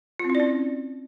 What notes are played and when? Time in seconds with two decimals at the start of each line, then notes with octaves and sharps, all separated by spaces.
0.19 F4
0.25 C4
0.30 E4
0.35 D5
0.40 C#4